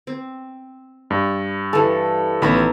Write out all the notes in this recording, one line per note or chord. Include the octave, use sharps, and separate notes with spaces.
C4
G2
E3 G3 A4
A1 D#3 B3 A#5 B5